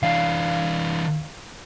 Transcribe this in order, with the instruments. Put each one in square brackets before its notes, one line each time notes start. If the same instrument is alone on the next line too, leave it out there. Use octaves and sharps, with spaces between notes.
[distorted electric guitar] E3 D4 [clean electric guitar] F5